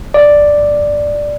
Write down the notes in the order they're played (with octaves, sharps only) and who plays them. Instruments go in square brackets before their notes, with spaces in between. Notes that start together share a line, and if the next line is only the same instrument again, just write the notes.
[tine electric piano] D5